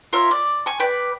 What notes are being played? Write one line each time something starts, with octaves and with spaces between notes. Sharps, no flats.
F4 A#4 C#5 E5
D5
G#5 C#6
B4 D5 G5